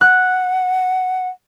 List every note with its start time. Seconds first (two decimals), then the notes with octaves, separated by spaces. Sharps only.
0.01 F#5 F#6